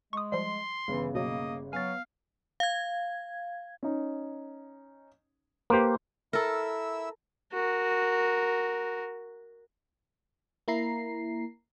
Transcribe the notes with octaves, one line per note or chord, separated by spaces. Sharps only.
G#3 C#6 D#6
F3 G3 C6
G1 C#3 E3
B2 F#3 A#3 D#5
F#3 B3 F5 G#5 A6
F5 G#6
C#4 D#4
A#3 G4 B4 C5 C6
E4 A4 A#4 E5 E6
F#4 A#4
A#3 E4 A#5 C7